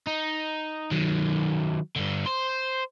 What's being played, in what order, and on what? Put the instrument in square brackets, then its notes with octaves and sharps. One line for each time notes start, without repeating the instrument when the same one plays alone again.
[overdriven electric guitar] D#4
D#3 F#3
G2 D3
C5 C6